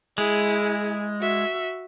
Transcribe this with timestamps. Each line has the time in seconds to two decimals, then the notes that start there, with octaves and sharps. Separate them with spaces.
0.18 G#3 E4 G#4
1.20 F#4 E5